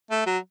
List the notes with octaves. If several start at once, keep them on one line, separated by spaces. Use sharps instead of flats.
A3
F#3